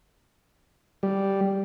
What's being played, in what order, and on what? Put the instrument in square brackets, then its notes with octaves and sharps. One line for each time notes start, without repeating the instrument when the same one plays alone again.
[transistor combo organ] G3